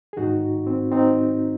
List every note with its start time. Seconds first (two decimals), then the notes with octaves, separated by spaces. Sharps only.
0.13 G#4
0.17 G#2 D#3 D#4 F#4
0.67 C4
0.92 C4 D#4